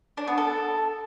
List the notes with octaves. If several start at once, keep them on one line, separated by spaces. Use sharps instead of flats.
D4
B3
A4